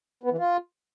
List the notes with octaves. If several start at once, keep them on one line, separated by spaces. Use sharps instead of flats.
B3
E3
F4